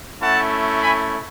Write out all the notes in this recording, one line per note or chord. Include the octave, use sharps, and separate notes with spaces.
A3 C#4 E4 F#5 A5
G#5 B5